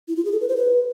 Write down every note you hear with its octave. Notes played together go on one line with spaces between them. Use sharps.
E4
F4
G#4
A4
B4
C5
B4